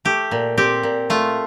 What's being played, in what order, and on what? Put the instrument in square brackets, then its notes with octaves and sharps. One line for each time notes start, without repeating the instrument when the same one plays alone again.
[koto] A3 G4
A#2
C4 G4
A#2
A3 F4